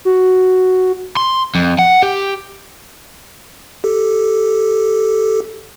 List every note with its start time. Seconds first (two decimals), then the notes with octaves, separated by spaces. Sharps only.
0.05 F#4
1.17 C6
1.55 F2
1.79 F#5
2.03 G4
3.84 G4 A4